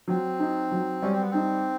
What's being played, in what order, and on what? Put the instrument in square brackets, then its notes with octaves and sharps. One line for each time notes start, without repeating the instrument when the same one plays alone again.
[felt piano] F#3 [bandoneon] C4
[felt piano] D#4
F#3
[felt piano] G3 [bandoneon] C#4
[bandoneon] C4
B3
[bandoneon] C4 [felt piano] D#4